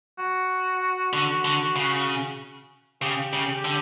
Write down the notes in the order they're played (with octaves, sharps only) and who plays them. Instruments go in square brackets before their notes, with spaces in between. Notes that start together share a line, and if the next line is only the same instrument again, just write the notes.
[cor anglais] F#4
[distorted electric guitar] D3
D3
C#3
[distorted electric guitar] C#3 [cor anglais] G4
[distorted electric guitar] C#3
D3